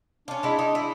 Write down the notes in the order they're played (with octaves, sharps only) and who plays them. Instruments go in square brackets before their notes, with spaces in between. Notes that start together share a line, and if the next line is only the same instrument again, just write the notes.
[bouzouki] C#4 F4 [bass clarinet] D4
[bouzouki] G#3 E4
D#4
E4